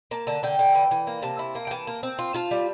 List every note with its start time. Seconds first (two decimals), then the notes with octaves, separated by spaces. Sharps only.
0.11 A#3 A5
0.27 D3 A5
0.43 D3 G5
0.59 D3
0.75 E3
0.91 E3
1.07 A#3
1.22 C3 A5
1.39 E4
1.55 A#3
1.67 G5
1.71 E3 A5
1.87 A#3
2.03 C4
2.19 F4
2.34 F4 A5
2.51 G3